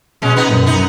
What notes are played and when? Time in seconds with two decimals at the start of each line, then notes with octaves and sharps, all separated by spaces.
0.22 B2 G#3 C#4
0.36 B3 D#4
0.52 F#2
0.66 B3 D#4